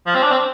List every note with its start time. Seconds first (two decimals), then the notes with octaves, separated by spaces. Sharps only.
0.06 F3
0.15 C4
0.23 D4
0.32 C4